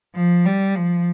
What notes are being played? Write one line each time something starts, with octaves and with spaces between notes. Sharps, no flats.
F3
G3
F3